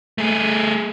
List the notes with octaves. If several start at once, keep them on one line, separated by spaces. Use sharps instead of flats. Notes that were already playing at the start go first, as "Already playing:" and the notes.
A3 G#4